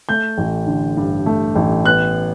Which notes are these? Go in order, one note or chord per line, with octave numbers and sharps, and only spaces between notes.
A3 G6
A1
D3
G2
A3
A1
B3 F#6